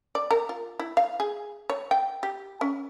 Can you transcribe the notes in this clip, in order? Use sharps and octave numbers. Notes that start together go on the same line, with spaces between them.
D5
A#4
F4
E4
F5
G#4
C#5
G5
G4
C#4